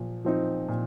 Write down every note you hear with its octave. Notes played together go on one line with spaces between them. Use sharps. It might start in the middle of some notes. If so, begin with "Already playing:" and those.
Already playing: A#2 F3
F3 C4 D#4
A#2